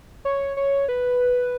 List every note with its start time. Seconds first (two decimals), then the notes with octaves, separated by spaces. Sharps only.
0.25 C#5
0.57 C#5
0.88 B4